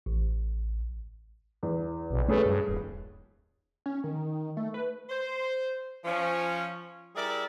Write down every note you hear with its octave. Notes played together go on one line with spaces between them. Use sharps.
A1
E2
B1
A3 C#4 G#4 B4
G2
D#1
C#4
D#3
A3
B4
C5
F3 C#4
G3 E4 G#4 A#4 D5 E5